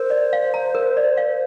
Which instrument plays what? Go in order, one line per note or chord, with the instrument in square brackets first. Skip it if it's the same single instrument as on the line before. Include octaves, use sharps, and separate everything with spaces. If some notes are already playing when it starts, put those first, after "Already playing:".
Already playing: [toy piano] A#4 [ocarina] C5
[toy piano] D5
F5
A#5
A#4
D5
F5